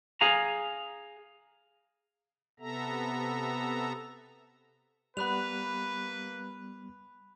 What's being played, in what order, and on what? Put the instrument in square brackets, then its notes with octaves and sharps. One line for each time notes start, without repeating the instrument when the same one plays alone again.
[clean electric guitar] G#4 F5 G#5 A#5
[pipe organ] C3 B3 A4 E5 A#5
[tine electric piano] G3 B3 [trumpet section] A#3 B4 [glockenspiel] B5 F#6 F7